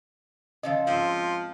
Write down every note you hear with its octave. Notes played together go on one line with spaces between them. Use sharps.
C#3 F3 A4 D#5
G#2 F3 C4